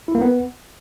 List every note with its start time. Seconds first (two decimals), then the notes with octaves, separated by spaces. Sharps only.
0.08 E4
0.15 A#3
0.22 B3